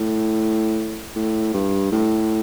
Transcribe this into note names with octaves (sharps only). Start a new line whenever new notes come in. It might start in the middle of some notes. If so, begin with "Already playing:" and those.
Already playing: A2
A2
G2
A2